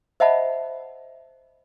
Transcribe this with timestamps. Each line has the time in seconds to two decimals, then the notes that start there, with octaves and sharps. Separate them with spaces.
0.20 C5 D#5 E5 F#5 A5 B5